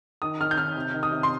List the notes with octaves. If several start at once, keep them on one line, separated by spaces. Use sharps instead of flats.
D#3 D#6
D#3 F6
G6
D#3 F6
C3
D#3
D#6
C3
C6